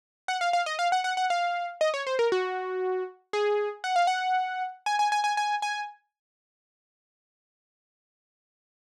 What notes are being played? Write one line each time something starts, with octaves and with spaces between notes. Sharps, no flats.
F#5
F5
F5
D#5
F5
F#5
F#5
F#5
F5
D#5
C#5
C5
A#4
F#4
G#4
F#5
F5
F#5
G#5
G#5
G#5
G#5
G#5
G#5